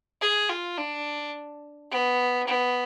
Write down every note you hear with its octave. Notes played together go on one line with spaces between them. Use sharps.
G#4
F4
D4
B3
B3